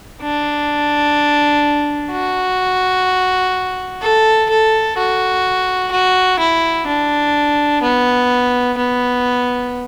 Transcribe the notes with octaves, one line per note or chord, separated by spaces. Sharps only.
D4
F#4
A4
A4
F#4
F#4
E4
D4
B3
B3